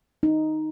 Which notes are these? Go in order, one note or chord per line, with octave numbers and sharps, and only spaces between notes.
D#4